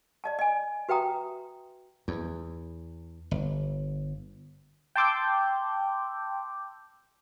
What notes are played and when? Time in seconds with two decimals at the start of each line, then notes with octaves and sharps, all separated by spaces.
0.24 D5 D#5 A5
0.39 D#5 G#5
0.89 F#4 B4 E5 G5 A#5 D#6
2.08 E2
3.31 G1
4.96 G5 A5 C6 D6 E6 G6